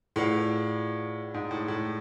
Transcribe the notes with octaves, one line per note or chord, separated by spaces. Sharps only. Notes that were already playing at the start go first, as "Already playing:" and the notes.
A2 F4 G#4 B4 D5 F#5
G#2
A2
A2